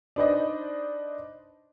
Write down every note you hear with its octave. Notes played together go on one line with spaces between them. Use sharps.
D4 D#4 B4 C5 D5 D#5